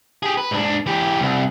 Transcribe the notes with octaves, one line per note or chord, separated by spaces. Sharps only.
G4 G#4
B4
G#2 D4
E3 G4
C2